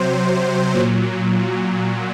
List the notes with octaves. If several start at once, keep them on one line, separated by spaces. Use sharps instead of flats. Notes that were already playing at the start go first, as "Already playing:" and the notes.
Already playing: C3 F#3 C5
A#2 F#3